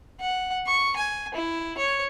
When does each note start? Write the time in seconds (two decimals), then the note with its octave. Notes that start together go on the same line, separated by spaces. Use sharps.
0.21 F#5
0.66 C#6
0.97 G#5
1.35 E4
1.78 C#5